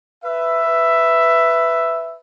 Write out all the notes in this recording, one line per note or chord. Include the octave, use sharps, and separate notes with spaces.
B4 E5